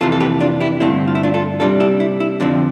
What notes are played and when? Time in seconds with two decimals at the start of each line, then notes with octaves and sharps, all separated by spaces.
0.01 F2 C3 E3 F4 A4
0.12 A4
0.20 G4 B4
0.40 D4 F4
0.60 E4 G4
0.80 G2 D3 A3 C4 E4
1.08 F4
1.15 E4
1.23 D4 F4
1.34 F4 A4
1.60 C3 G3 D4 F4 A4
1.80 E4 G4
2.00 E4
2.20 E4
2.40 F2 D3 F3 C4 D4